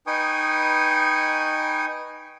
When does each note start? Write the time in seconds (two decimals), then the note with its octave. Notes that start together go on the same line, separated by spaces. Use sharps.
0.07 D#4 B4 G5 G#5 C#6 D#6